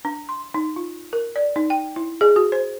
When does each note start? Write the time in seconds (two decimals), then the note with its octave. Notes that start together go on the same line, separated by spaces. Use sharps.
0.05 D4
0.29 C6
0.54 D#4
0.76 F4
1.13 A#4
1.36 D5
1.56 D#4
1.70 G5
1.96 E4
2.21 G#4
2.36 F#4
2.52 C5